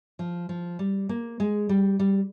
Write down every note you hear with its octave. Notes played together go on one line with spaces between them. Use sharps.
F3
F3
G3
A#3
G#3
G3
G3